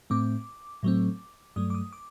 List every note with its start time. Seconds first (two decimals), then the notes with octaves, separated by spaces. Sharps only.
0.10 A2 A3 C4 D6
0.83 A2 F#3 A3 C4
1.56 G2 F#3 A3 D#6
1.70 D6
1.75 D#6
1.93 D6